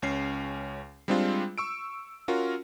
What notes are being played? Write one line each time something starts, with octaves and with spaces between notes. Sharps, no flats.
C#2 C#4 C7
G3 G#3 C4 D4 F4
C#6 E6 D7
C#4 F4 F#4 A#4